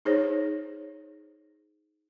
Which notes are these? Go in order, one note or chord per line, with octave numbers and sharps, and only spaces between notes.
D#4 G#4 C5 C#5